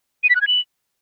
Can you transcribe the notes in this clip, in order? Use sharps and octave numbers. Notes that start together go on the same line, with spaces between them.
D#7
B6
F#6
G#6
F#7